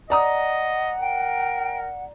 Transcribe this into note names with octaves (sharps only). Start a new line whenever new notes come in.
D5 D#5 F#5 A#5 D#6
A#4 G5